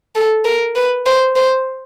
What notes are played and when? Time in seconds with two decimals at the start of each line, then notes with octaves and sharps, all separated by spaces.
0.15 A4
0.45 A#4
0.76 B4
1.06 C5
1.36 C5